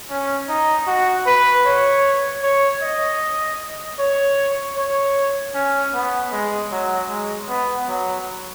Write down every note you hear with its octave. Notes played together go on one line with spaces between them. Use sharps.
C#4
D#4
F#4
B4
C#5
C#5
D#5
C#5
C#5
C#4
B3
G#3
F#3
G#3
B3
F#3